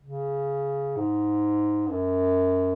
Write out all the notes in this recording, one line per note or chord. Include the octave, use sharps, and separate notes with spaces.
C#3
G#2
G2
F#2